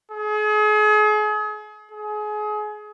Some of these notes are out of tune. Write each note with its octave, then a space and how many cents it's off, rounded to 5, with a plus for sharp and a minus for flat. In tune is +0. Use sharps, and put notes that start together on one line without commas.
G#4 +35
G#4 +30